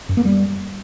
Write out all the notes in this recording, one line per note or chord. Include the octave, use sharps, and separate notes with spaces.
F#2
A#3
G3